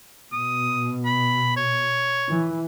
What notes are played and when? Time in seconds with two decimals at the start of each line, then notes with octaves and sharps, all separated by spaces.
0.33 B2 D#6
1.05 B5
1.57 C#5
2.30 E3